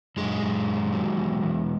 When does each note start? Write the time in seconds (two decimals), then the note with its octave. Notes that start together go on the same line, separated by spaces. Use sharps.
0.17 F#2 G#3
0.43 F#2
0.67 D#3
0.93 F#3
1.17 E2
1.43 E2